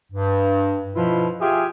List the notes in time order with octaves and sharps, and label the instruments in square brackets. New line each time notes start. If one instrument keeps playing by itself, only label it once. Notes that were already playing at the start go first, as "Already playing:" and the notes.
[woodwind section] G2
B2 F3 E4 F4 B4
F4 G4 G#4 E5 G#5